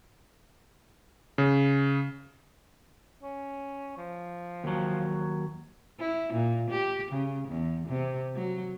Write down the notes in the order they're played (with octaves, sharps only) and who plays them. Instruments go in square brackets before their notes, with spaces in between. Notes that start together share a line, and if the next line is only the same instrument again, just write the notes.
[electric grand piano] C#3
[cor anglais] C#4
F3
[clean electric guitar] D#2 F#3
[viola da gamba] E4
A#2
G4
C#3
E2
C3
F#3